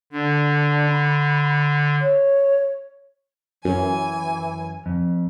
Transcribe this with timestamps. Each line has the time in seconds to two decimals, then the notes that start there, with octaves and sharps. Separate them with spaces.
0.12 D3 D4
0.90 B5
2.00 C#5
3.65 F#2 E3 G#5
4.86 F2